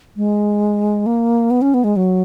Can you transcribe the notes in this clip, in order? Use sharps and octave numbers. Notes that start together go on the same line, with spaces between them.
G#3
A#3
B3
C#4
B3
G#3
F#3